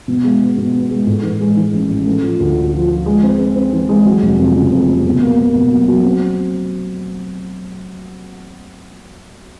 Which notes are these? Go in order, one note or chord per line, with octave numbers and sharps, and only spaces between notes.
B2
G#3
B3
B2
B3
G#3
A2
E3
G#3
E3
A1
A1
A3
F3
D2
D3
F3
F3
G#3
C4
C4
C4
E3
G#3
F#3
F1
F2
C#3
F2
F1
B2
A#3
A#3
B2
F#3
F#3
C4